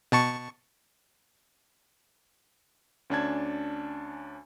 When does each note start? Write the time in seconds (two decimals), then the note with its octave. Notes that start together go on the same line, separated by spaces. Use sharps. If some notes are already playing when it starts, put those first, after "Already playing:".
0.12 B2 A5 C#6
3.10 D2 C#4 D4 G#5 A5 G#6